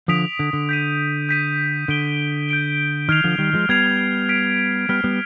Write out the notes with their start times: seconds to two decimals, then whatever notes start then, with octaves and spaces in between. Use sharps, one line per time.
0.08 D3 F3 D#6 B6 D7 F7
0.39 D3
0.53 D3
0.69 G6 B6 D#7
1.29 G6 B6 D#7
1.88 D3 G6 D7 G7
2.49 G6 D7 G7
3.09 D#3 F6 G#6 C7 F7
3.24 D3 F3
3.38 D#3 G3
3.53 F3 G#3
3.69 G3 B3 F6 G#6 C7 F7
4.29 F6 B6 D7
4.89 G3 B3 F6 B6 D7
5.04 G3 B3